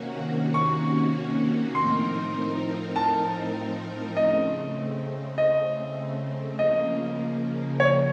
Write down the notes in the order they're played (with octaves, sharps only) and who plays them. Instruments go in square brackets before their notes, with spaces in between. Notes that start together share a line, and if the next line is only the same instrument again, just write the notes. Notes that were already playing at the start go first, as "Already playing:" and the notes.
Already playing: [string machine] C3 D#3 A#3 C#4 F#4
[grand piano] C#6
[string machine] A2 F3 C4 D#4 A#4 [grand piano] C6
[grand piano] A5
[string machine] C#3 A3 C4 [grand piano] D#5
[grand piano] D#5
[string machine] C#3 F3 A#3 [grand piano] D#5
[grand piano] C#5